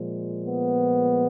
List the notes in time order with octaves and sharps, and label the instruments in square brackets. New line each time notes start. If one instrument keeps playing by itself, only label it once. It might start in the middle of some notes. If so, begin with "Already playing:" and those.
Already playing: [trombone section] A#2 F3 G#3
B3